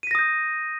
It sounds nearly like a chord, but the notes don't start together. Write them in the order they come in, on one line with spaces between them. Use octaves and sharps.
D#7 B6 A#6 D#6 G6